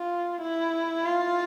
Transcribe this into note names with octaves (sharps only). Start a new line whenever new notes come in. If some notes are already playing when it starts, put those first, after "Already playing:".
Already playing: F4
E4
F4